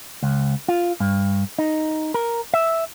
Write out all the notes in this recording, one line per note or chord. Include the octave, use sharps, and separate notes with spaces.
C#2
F4
G2
D#4
A#4
E5